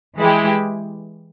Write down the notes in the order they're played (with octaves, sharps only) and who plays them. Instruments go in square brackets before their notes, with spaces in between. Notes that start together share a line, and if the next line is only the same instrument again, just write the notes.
[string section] E3 G#3 E4 G4